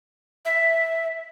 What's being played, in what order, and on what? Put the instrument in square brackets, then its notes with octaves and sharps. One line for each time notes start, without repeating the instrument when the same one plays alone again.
[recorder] E5